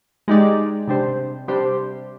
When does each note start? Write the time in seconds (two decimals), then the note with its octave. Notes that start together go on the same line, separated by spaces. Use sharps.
0.28 G#3 D#4 G4 D5
0.87 C3 G3 D4 G4 C5
1.48 C3 G3 D4 G4 C5